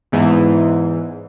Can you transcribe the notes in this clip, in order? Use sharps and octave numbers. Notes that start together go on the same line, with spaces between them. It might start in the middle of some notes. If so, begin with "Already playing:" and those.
E2 G#2 E3